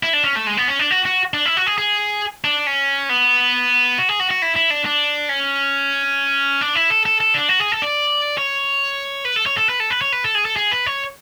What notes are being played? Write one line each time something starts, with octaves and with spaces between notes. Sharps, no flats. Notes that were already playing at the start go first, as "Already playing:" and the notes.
E4
D4
C#4
A3
G#3
B3
C#4
D4
F#4
F#4
D4
E4
F#4
G#4
G#4
D4
C#4
B3
F#4
G#4
F#4
F#4
E4
E4
D4
D4
C#4
D4
E4
A4
A4
A4
D4
F#4
G#4
A4
D5
C#5
B4
A4
C#5
A4
B4
A4
B4
C#5
B4
A4
G#4
A4
G#4
B4
C#5